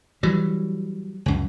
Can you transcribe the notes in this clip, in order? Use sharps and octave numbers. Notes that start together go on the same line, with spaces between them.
E3 F#3 G3
C#2 F#2